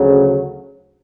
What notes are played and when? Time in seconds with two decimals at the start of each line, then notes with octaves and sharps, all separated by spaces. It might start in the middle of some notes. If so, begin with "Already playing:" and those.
Already playing: D2 C#3 F#3